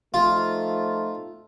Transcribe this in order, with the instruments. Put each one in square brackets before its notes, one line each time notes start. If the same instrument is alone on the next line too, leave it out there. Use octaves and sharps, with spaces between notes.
[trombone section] F3 A3 D#4 A4 [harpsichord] F4